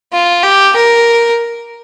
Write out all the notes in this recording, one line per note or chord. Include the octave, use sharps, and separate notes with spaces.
F4
G4
A#4